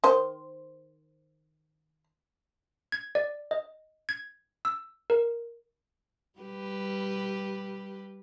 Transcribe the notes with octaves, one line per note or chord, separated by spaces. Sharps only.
D#3 C5
G#6
D5
D#5
G#6
E6
A#4
G3 G4 B4